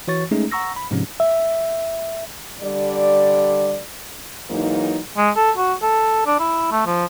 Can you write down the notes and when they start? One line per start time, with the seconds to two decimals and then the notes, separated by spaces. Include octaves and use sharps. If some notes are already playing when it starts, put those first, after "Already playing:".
0.08 E3 F#4 C#5 C#6 A6
0.31 G#3 A3 C#4 D#4 G#4
0.51 F#5 A#5 C#6 E6 A#6
0.76 B5
0.91 G#2 C3 F3 G#3 C#4
1.20 E5
2.62 D3 G3 D5
4.50 G#2 E3 F#3 A#3 D#4
5.17 G#3
5.37 A4
5.58 F#4
5.83 A4
6.27 D4
6.40 E4
6.72 A3
6.86 F3